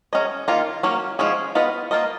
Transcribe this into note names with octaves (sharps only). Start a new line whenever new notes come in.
F#3 C#4 G#4 D#5
D#3 A#3 F4
F#3 A#3 C#4
F3 G#3 C#4 G#4
B3 F4 B4 D#5
A#3 F4 A#4 D#5